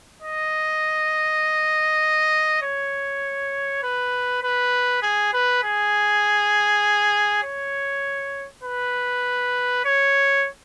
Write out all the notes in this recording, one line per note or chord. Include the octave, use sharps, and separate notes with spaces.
D#5
C#5
B4
B4
G#4
B4
G#4
C#5
B4
C#5